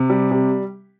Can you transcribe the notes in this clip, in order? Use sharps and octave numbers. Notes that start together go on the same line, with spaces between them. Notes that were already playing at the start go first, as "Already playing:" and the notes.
Already playing: C3
G3
C3